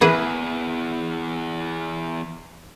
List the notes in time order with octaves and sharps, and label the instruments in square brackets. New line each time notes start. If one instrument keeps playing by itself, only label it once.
[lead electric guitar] E2 [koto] E3 G#4 B4